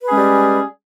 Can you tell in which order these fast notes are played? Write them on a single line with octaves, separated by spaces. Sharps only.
B4 G#4 C#4 G#3 G3